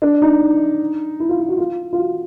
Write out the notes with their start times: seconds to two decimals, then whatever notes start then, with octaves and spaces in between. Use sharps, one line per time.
0.02 D4
0.22 D#4
1.20 E4
1.29 F4
1.39 F4
1.49 F#4
1.58 F4
1.93 F4
1.98 F#4